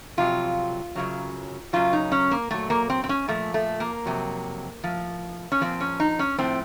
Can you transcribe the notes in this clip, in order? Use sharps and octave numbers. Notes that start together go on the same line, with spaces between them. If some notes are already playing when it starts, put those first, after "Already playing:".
F2 C3 F#3 F4
F#2 C#3 F#3
F#2 C#3 F#3 F4
D#4
C#4
A#3
A#2 F#3 A3
A#3
C4
C4
C#4
A#2 F3 A3
A3
A#3
F2 C3 F#3
A2 F3
C#4
A#2 F3 C4
C#4
D#4
C#4
A2 F3 C4